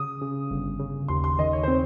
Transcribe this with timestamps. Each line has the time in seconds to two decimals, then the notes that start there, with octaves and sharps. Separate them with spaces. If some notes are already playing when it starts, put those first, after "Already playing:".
Already playing: C#3 D#6
0.21 C#3
0.51 G1
0.79 C#3
1.08 D#2 C6
1.24 C6
1.39 D#3 D#5
1.53 C#5
1.63 C4 C5